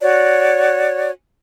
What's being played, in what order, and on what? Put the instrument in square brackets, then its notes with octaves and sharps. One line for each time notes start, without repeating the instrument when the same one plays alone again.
[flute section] F#4 C#5 D5